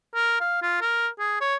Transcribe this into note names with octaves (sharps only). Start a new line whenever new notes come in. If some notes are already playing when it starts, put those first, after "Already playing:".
A#4
F5
F4
A#4
G#4
C#5